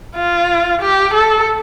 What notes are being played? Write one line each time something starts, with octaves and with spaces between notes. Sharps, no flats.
F4
G4
A4